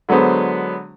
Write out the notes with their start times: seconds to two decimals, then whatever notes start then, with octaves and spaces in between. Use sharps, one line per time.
0.09 D3 F#3 G#3 B3 C5